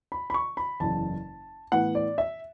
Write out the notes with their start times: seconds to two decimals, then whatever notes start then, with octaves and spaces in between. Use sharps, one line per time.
0.12 B5
0.30 B5
0.34 C#6
0.57 B5
0.80 F#1 E2 C#3 A5
1.72 A2 E3 B3 F#5
1.95 D5
2.18 E5